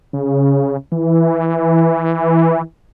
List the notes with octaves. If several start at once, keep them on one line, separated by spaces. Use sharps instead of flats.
C#3
E3